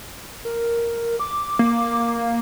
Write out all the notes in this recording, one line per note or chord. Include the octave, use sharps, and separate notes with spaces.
A#4
D6
A#3